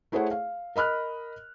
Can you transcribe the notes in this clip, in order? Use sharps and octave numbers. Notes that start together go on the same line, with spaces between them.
A3 E4 G#4 C5 C#5 F#5
F5
A#4 D#5 B5 F6 F#6